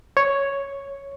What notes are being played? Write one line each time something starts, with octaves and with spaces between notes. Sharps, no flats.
C#5